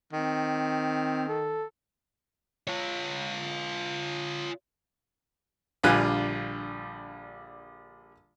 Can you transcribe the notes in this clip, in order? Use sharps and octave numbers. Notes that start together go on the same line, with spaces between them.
D#3 C4
A4
F4 C#5
A#1 D3 G3 F4 G#5 F#6